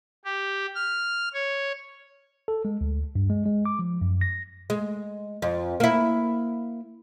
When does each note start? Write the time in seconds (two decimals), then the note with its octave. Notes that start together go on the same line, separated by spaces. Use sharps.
0.25 G4
0.75 F6
1.34 C#5
2.48 A4
2.65 G#3
2.81 D2
3.15 G2
3.30 G#3
3.46 G#3
3.66 D6
3.79 F3
4.01 F#2
4.21 A#6
4.70 G#3
5.42 F2
5.80 A#3 E4